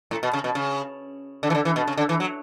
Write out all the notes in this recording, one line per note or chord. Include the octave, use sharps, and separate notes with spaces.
A2
B2
C#3
B2
C#3
D3
E3
D3
E3
B2
C#3
D3
E3
F#3